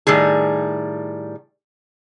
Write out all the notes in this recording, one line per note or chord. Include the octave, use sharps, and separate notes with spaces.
A2 D#3 G3 G#4